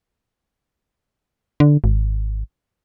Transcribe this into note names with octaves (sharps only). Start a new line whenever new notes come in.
D3
G#1